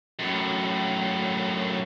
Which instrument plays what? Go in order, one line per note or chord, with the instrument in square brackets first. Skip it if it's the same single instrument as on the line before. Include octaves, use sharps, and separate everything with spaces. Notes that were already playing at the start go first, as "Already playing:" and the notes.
[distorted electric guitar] F#2 A2